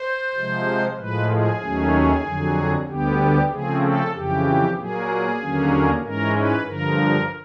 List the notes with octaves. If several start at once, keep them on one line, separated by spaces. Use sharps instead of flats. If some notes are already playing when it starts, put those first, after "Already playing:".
Already playing: C5
C3 F3 G#3
A2 F3 G#3 B4
G#4
D#2 D#3 F#3 A3 C#4
F2 D3 F#3
D2 D3 G3 B3 G4
C#3 F3 A3 C4 G#4
A4
F2 C#3 E3 G4
A#2 F#3 A#3 G#4
D#2 D3 F#3 A#3 C#4
G#2 E3 G#3 C#4 A#4
B4
G2 D3 F3 A#4